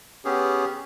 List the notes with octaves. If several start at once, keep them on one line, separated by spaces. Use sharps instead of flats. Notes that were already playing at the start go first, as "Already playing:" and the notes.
B3 C#4 G4 G#4